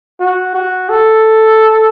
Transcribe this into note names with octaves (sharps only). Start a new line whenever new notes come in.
F#4
F#4
A4